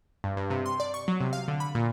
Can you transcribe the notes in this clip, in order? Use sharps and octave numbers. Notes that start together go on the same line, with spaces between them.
G2
G2
C3
C6
D5
C#6
F#3
C3
F5
D3
B5
A#2